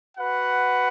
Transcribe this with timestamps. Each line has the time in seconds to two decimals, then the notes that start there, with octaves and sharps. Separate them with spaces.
0.18 F#4 B4 F#5